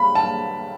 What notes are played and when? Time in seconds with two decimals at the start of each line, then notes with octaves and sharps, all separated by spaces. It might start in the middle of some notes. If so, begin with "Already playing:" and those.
Already playing: B5
0.15 A5